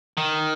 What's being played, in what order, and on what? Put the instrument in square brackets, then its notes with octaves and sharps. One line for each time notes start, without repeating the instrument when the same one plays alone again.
[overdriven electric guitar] D#3